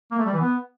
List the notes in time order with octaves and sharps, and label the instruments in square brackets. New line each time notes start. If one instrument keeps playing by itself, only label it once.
[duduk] A#3
A3
G3
E3
B3